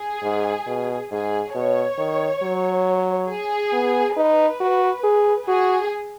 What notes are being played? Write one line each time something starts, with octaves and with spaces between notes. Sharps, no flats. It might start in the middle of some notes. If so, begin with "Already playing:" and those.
Already playing: G#4
G#2
B2
G#2 G#4
B2 C#5
D#3
F#3
G#4
B3
D#4 B4
F#4
G#4
F#4 G#4